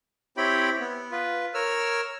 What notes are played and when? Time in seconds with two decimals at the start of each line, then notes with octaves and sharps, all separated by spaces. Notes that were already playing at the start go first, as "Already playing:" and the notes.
0.37 C4 E4 G4 C#5 G5 B5
0.80 B3
1.12 F4 B4
1.54 A#4 C#5 E6 F6